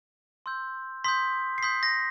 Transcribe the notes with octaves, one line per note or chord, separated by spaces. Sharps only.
C6 E6 G6
C6 D#6 G6 B6
C7
C6 D#6 G6 B6
A#6